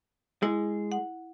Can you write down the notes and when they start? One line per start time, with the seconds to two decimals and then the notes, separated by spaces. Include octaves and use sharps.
0.43 G#3 E4
0.92 F#5